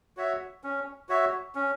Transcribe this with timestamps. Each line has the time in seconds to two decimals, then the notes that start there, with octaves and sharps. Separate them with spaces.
0.17 F#4 C#5 E5
0.64 C#4
1.09 F#4 C#5 E5
1.55 C#4